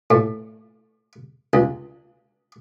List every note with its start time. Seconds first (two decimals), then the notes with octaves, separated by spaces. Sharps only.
0.11 A2
1.53 C#2